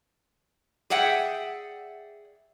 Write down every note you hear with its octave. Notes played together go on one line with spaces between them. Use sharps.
G#4 D5 E5 F#5 G5